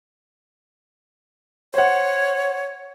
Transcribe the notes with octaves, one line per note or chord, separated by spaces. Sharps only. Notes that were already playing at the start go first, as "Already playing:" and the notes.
C5 C#5 F#5